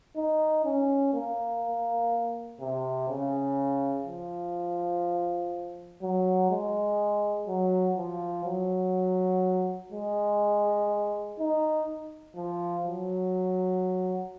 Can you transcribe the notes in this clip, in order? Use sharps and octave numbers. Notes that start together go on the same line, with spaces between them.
D#4
C#4
A#3
C3
C#3
F3
F#3
G#3
F#3
F3
F#3
G#3
D#4
F3
F#3